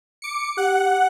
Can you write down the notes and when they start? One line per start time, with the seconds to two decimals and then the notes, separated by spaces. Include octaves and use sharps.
0.22 D6 C#7
0.57 G4 F#5